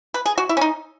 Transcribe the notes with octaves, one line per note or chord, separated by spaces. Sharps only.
B4
G#4
F#4
E4
C#4
D#4